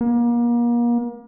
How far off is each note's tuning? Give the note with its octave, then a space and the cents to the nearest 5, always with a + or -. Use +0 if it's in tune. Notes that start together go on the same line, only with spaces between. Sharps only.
A#3 +35